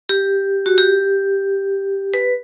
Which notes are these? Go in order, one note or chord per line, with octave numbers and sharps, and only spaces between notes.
G4
F#4
G4
B4